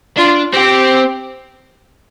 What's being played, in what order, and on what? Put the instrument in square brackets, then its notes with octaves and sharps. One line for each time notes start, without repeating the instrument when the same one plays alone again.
[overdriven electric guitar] D4 [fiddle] F4
[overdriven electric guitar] C4 [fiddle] G4